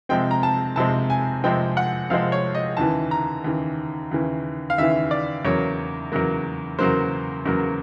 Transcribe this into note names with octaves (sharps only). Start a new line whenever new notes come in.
C3 F3 G#3 C4 G5
A#5
A5
C3 F3 G#3 C4 A5
G#5
C3 F3 G#3 C4 G5
F#5
C3 F3 G#3 C4 F5
C#5
D#5
D#2 C#3 E3 A5
A#5
D#2 C#3 E3
D#2 C#3 E3
F5
D#2 C#3 E3 E5
D5
E2 C#3 F#3 A#3 C#5
E2 C#3 F#3 A#3
E2 C#3 F#3 A#3 C5
E2 C#3 F#3 A#3